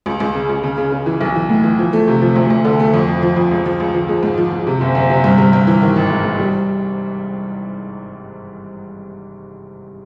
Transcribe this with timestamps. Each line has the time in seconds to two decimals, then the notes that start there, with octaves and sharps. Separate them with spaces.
0.06 C#2
0.20 C#2
0.35 C#3
0.49 C#2
0.63 C#3
0.78 C#3
0.92 C#3
1.06 E3
1.21 B1
1.35 E3
1.49 A2
1.64 E3
1.79 F3
1.93 A3
2.08 C3
2.22 F3
2.36 D2
2.50 D2
2.65 D3
2.80 A3
2.94 F2
3.08 F3
3.22 F3
3.37 F2
3.51 C#2
3.66 F3
3.80 C#2
3.94 F3
4.09 G#3
4.23 G#2
4.38 F3
4.52 F3
4.66 C3
4.81 F#1
4.95 F#1
5.10 C3
5.24 G2
5.38 G2
5.53 G2
5.67 E3
5.82 D#3
5.96 G#1
6.10 G#2
6.24 G#2
6.39 G3